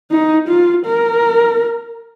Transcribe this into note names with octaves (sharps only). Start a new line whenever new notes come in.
D#4
F4
A#4